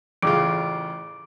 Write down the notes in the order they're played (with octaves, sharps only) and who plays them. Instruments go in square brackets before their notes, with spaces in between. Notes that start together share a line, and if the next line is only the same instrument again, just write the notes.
[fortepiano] A1 C#3 F4 [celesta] D6 D7